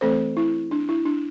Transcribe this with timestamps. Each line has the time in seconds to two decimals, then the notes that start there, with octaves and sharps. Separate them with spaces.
0.01 E3 A3 C4 A4 C5
0.37 E4
0.71 D4
0.89 E4
1.06 D4